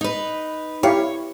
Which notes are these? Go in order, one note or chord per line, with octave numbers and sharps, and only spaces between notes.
D#4 B4
E4 G4 C#5 F5